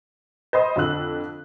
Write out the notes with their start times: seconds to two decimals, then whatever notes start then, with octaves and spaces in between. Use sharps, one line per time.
0.53 C5 D#5 B5 C6 D#6
0.76 F2 D3 F4 E6 F#6 F#7